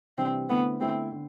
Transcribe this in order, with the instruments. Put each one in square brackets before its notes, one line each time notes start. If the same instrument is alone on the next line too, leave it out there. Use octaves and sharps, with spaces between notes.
[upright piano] C3 E3 G3 D4 G4 [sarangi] C4
[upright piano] D3 A3 E4 [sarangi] B3
[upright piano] D3 A3 E4 [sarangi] C4
[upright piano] D3